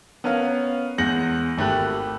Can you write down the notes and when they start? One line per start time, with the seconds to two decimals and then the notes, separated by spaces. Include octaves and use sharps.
0.24 B3 C#4 A#4 C#5 F5
0.98 E2 G#3 G6 A#6 C#7 F#7
1.58 G#1 A3 G4 B5 F#6 F#7